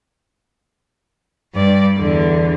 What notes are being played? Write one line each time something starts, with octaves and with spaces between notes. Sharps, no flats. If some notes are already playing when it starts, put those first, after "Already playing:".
G2 D5
E2 D3